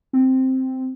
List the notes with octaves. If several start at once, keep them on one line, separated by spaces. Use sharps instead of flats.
C4